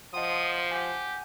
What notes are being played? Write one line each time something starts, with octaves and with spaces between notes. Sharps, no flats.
F3 D#5 F#5 C6 D#6
G4 F#5 G#5